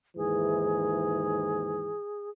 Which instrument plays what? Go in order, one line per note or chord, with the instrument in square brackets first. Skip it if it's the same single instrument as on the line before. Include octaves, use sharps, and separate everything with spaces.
[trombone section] D#2 G#2 E3 [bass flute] G#4